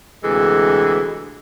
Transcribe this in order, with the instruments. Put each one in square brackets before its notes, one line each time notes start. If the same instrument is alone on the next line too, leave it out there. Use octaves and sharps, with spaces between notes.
[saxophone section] D2 C3 E3 G#3 A4